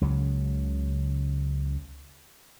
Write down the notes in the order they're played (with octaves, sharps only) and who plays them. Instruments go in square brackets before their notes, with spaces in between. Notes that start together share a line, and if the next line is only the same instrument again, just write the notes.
[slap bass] C#2 C#3 F#3